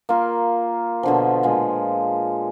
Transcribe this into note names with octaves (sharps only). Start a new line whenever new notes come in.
A#3 F4 A#4
B2 D3 F3
A#2 F3 G#3